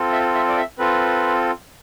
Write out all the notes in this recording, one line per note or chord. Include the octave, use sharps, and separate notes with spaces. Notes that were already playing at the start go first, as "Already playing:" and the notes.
Already playing: C4 F4 A4
E5
E5
D5
E5
C4 F4 A4 B4